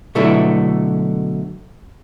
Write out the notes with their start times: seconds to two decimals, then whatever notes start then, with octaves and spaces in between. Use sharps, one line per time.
0.15 B2 D3 F#3 A3 B3 E4